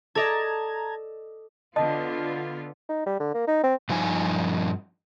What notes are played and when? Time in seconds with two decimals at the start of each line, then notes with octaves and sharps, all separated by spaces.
0.15 A4 D5 D#5 A5 A#5 G#6
1.76 D3 B3 F4 D#5 A5 D#6
2.89 D#4
3.06 G3
3.20 D3
3.34 A#3
3.47 D#4
3.63 C4
3.89 G2 F3 D#4 G#5